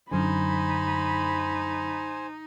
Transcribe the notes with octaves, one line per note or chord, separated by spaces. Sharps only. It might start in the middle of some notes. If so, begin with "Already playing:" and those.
F#2 D3 D#4 C5 G#5 B5